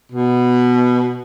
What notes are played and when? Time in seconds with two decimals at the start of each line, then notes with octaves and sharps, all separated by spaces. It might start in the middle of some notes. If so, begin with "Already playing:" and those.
0.12 B2